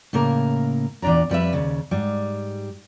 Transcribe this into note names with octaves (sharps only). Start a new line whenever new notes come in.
A2 C#3 A#3 A#4
E2 A#2 D4 D5 A#5
F2 G3 B4 E5
D#2 C#3
G#2 G3